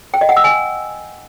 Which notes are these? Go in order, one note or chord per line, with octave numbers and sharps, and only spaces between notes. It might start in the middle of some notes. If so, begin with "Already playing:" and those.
G5
D#5
F#5
E6
G#5